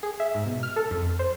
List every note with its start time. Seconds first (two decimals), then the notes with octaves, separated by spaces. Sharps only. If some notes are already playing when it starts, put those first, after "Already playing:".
0.03 G#4
0.20 E5
0.34 G#2
0.46 B2
0.63 F6
0.76 A4
0.91 F2
1.19 C5